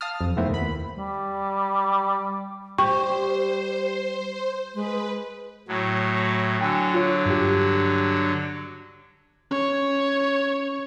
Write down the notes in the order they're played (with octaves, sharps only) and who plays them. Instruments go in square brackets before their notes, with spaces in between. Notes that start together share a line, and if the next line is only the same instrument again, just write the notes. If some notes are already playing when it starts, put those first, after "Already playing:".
[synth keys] F5 A5 D#6 F6
F2
C3 D#3 A3 B3 C4 E4
D#2 B5
[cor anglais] G3
[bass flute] G3 [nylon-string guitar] G4 [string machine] C5 [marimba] C#6
[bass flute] G#3 [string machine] B4
[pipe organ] A2 F#3
[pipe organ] D3 F#3 [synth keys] G5 G#5 E6
[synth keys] F4 C#5
G2 G4
[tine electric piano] C#4 [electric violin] C#5